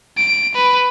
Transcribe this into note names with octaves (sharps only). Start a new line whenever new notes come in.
D7
B4